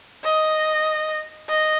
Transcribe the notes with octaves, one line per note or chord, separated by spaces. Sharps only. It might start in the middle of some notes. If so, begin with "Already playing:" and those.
D#5
D#5